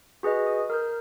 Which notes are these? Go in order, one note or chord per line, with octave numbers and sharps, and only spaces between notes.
F#4 G#4 B4 D#5
D#6
A#4 F6 G6